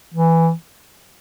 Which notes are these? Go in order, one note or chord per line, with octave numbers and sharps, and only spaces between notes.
E3